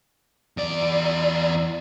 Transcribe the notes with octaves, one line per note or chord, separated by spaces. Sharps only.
E2 D5